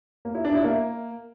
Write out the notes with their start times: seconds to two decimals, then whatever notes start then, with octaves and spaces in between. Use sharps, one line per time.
0.25 A#3
0.35 E4
0.45 D4
0.54 E4
0.64 A#3